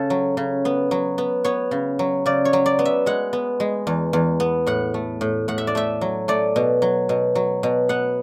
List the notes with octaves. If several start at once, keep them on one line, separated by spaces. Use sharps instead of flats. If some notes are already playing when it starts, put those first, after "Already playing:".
Already playing: C#3 A4
F#3
C#3
B3
F#3
B3
B3 C#5
C#3
F#3
C#3 D5
C#5
F#3
D5
B3
E5
G#3 F#5
B3
G#3
E2
E2
B3
A2 F#5
A3
A2
A2 F#5
E5
D5
A3 E5
F#3
A3 D5
B2
F#3
B2
F#3
B2
B3 F#5